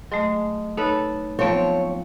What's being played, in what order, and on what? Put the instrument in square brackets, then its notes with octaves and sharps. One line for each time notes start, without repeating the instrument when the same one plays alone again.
[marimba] F#3 A3 [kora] G#3
[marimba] D#4 C#5 [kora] A4 B4
[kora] F3 C4 [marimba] F#3 B3 [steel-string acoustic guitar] C#5